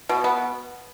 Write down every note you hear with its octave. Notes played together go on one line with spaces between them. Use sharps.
B2
B3